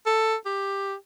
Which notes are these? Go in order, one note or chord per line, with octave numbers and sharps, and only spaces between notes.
A4
G4